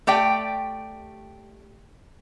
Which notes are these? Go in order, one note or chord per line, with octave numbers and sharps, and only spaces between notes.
A3 G4 D5 G5